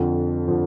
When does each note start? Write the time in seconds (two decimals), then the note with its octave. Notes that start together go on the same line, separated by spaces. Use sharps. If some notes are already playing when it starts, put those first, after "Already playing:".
Already playing: F2 D3 F3
0.47 D3 F3